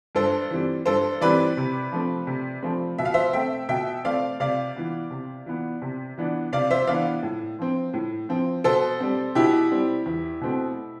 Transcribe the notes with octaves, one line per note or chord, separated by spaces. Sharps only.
G2 A4 C5
E3 G3 C4
G2 A4 C5
E3 G3 C4 B4 D5
C3
F3 A3 C4
C3
F3 A3 C4
B2 E5
F5
C5 E5
A3 C4 E5 G5
B2 E5 G5
A3 C4 D5 F5
C3 D5 F5
E3 B3
C3
E3 B3
C3
E3 B3 D4
C3 D5 F5
C5 E5
E3 B3 D4 D5 F5
A2
F3 C4
A2
F3 C4
B2 A4 C5
G3 C4
B2 E4 G4
G3 C4
E2
B2 A3 C4